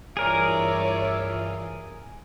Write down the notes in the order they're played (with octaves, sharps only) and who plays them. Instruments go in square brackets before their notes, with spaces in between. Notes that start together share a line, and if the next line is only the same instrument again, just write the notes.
[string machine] G2 E3 F4 [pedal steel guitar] G#4 A#4 [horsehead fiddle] C#5 D5 [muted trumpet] E5